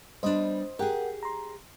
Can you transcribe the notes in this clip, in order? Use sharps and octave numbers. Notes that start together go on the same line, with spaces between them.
G3 B3 D4 C5 D#5
G4 G#4 A#4 F#5 G5
A#5 C6